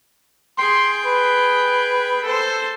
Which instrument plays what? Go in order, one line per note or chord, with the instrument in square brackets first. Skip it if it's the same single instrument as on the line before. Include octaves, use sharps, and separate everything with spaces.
[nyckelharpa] G#4 G5 [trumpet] C6
[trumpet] B4
[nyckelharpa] A4 C5